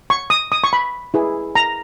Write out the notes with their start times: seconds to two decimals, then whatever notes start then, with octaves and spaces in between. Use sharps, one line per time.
0.10 C#6
0.30 D#6
0.52 D#6
0.64 C#6
0.73 B5
1.14 E4 G#4 B4
1.55 A#5